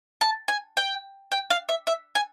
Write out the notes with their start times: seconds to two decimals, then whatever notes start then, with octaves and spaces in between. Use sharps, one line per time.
0.21 A5
0.48 G#5
0.77 G5
1.32 G5
1.50 F5
1.69 E5
1.87 E5
2.15 G#5